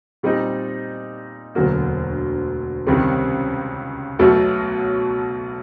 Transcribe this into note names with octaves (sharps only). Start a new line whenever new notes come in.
A#2 G3 C4 D#4
E1 D2 D3 F#3 A#3
C#2 C3 D#3 G3 C4
B1 B2 F#3 A3